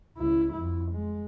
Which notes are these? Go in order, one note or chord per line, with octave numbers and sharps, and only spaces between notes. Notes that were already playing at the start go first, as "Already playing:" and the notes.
C#2 E4
F2 E4
G#3